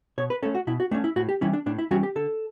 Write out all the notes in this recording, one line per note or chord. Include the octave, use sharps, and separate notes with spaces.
B2 C#5
B4
A3 C#4 A4
F#4
B2 E4
F#4
A3 C#4 D4
E4
A2 F#4
G4
E3 G3 C#4 E4
D4
A2 D4
E4
E3 G3 C#4 F#4
G4
D3 A4